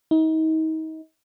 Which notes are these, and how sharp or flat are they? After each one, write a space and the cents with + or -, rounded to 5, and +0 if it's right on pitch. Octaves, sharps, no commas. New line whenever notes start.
D#4 +35